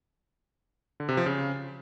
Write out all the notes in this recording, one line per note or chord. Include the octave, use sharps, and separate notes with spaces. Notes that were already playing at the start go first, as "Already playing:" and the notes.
D3
C3
F3
C#3